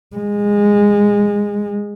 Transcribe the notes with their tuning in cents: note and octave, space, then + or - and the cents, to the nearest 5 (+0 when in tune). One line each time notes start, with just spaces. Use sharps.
G#3 -15